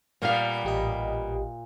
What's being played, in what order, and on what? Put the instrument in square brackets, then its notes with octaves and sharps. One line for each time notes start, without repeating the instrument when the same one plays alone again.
[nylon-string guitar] A#2 F5 [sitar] G3 A#3 B3
[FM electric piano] A1 G4 D#5